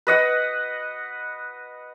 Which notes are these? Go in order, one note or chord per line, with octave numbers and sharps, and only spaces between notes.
B4 D#5 F#5